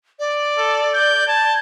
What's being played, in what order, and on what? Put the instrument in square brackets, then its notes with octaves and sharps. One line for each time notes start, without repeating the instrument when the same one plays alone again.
[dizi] D5
[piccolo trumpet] A4
G6
[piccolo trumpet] A5 [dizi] G#6